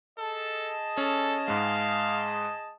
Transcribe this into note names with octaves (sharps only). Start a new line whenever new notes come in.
G#4 A4 D#5 A5
C#4 A4
G#2 G#3 F5